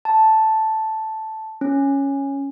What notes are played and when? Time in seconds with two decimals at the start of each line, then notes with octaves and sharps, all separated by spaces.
0.05 A5
1.61 C#4